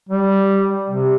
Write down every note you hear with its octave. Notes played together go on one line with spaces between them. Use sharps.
G3
C3